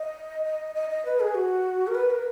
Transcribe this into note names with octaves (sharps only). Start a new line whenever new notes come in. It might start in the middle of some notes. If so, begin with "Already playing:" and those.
Already playing: D#5
D#5
D#5
D#5
B4
G#4
F#4
A#4
B4
A#4